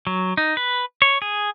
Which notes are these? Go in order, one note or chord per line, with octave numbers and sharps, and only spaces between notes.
F#3
D#4
B4
C#5
G#4